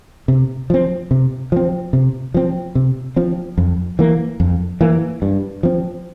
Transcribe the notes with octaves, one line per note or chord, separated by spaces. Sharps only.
C3
F3 C4
C3
F3 C4
C3
F3 C4
C3
F3 C4
F2
E3 A#3
F2
E3 A#3
G2
F3 C4